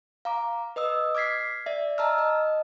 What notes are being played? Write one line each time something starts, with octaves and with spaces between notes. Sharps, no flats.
F5 A#5 D6
B4 D#5 D#6 E6
D6 F6 G#6 B6 C7
D5 E5
D#5 A5 A#5 E6 F6
D#5